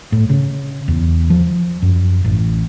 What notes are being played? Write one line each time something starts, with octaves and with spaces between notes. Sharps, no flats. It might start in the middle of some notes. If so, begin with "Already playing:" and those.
A2
C#3
E2
F3
F#2
A1